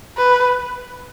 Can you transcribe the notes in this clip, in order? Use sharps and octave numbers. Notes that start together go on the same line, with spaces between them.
B4